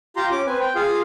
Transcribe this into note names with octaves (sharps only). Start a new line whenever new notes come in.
F4 G4 A#5 C6
C#4 D6
C4 B4 G#5
G5
F4 G#4 F5